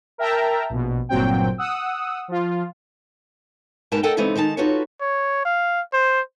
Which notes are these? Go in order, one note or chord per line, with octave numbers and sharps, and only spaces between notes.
A#4 E5 G5 A5 A#5
A#1 B2
G1 A#2 F#3 C4 G5
F#5 D#6 E6
F3 F4
G#2 B2 B3 A#4 G5 A5
A4 A#4 D#5 F#5 G5 A5
C#3 E3 G#3 B3 C4 D#4
D#3 G#3 D#4 A5
D#4 F4 F#4 A4 B4 C#5
C#5
F5
C5